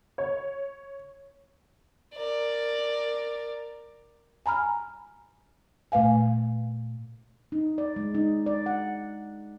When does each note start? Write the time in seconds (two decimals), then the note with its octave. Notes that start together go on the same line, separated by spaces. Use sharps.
0.18 C#5
2.14 A#4 D5
4.46 G#5 A#5 B5 F6
5.92 A#2 A3 B4 F5 G#5
7.52 D#4
7.78 D5
7.96 G#3
8.15 D#4
8.46 D5
8.66 F#5